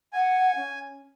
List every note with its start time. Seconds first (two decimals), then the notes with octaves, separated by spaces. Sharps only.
0.13 F#5 G#5
0.55 C#4